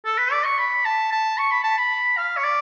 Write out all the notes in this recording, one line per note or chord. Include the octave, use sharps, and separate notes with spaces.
A4
B4
D5
C#6
B5
A5
A5
C#6
B5
A5
B5
F5
C#5
D5